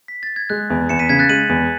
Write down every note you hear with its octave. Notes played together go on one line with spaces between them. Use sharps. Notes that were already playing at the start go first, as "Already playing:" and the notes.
B6
A6
G#6
G#3 F#6
E2
E2 C#7 E7
B6 D#7
C#3 G#6 B6
F#6 A6
G#3 D#7 F#7
E2